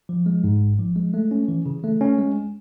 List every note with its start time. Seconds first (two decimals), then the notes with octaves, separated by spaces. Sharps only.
0.09 F3
0.26 G#3
0.44 G#2
0.61 G#1
0.79 F3
0.96 G#3
1.14 A3
1.31 C#4
1.48 E3
1.66 C#3
1.84 A3
2.01 C#4
2.18 G#3